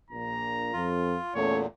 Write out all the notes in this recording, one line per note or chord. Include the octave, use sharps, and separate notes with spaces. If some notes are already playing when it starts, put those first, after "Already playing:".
A#1 A#2 A#5
F2 F4
E2 A#2 A3 C#4 C#5